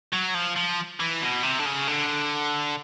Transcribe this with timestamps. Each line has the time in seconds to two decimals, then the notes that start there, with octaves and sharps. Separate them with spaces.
0.13 F#3
0.34 F3
0.56 F3
1.00 E3
1.21 B2
1.43 C3
1.59 D3
1.65 C#3
1.87 D3